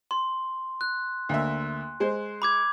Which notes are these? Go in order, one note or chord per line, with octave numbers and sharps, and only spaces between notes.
C6
F#6
D2 A#3 E5
G#3 C5
B5 D6 G#6